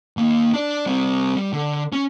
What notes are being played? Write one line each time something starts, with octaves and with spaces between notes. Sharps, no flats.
D#2 A#3
D4 D5
G3 C4
G3
D3
C#4